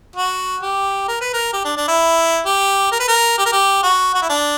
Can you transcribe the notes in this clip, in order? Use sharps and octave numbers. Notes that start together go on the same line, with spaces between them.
F#4
G4
A#4
B4
A#4
G4
D4
D4
E4
G4
A#4
B4
A#4
G4
A#4
G4
F#4
F#4
E4
D4